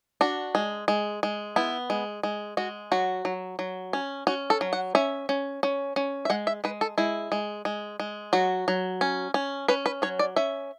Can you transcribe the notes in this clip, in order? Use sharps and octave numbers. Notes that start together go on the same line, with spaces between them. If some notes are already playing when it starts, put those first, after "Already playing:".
D4 F#4
G#3
G#3
G#3
B3 E4
G#3
G#3
G#3 F#4
F#3 F#4
F#3
F#3
C#4
C#4 F#4
A4
F#3
F#5
C#4 E5
C#4
C#4
C#4
E5
G#3 F#5
E5
G#3 B4
A4
G#3 E4
G#3
G#3
G#3
F#3 F#4
F#3
C#4
C#4
C#4 B4
B4
F#3 C#5
D5
C#4 E5